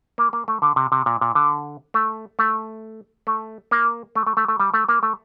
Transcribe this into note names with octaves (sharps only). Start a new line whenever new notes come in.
A#3
A#3
A3
D3
C3
C3
A#2
A#2
D3
A3
A3
A3
A#3
A3
A3
A3
A3
G3
A3
A#3
A3